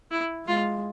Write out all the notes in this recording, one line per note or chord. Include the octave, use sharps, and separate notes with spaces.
E4
G#3 F4